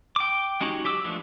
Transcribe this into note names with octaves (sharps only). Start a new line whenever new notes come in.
G5 D6
G#3 C#4 D#4 F#4 G4
F#3 G4 D6 E6
E3 F3 G#3 A3 D4